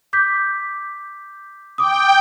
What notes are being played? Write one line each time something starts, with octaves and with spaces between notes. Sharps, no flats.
D6 G6 B6
G5 D6 D#6